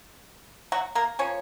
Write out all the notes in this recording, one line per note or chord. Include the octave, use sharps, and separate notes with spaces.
F#3 F#4
A#3 A#4
F3 A#3 C#4 C#5